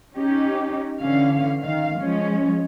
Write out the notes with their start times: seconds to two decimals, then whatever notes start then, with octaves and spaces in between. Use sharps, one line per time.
0.15 C#4 D#4 G4
1.01 D3 E3 C#4 F5
1.62 D#3 F5
1.99 F3 G#3 C#4